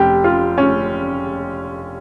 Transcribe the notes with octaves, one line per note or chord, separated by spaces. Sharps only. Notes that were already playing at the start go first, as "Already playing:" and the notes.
Already playing: F1 G4
F4
C#4